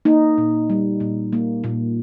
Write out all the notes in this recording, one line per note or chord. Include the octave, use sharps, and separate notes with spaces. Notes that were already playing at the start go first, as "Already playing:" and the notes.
A#3 D#4
A#2
G3
A#2
A#3
A#2